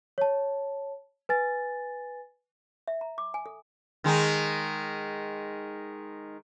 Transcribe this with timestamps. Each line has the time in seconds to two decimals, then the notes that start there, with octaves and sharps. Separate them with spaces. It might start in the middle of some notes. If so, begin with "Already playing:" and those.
0.18 C#5 A5
1.29 B4 G#5 A6
2.88 E5
3.01 A#5
3.18 D6
3.34 G#5
3.46 A4
4.04 D#3 G#3 D#4